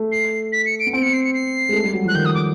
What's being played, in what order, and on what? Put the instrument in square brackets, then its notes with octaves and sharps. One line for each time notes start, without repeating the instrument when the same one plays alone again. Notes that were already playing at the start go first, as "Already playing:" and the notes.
Already playing: [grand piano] A3
[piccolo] C7
B6
C#7
D7
[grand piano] B3
[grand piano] C4 [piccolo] D7
[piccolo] C#7
C7
C#7
C7
[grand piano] G#3
A3
G3
F#3
F3
[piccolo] F#6
[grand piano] D#3 [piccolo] G6
[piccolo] D#6
D6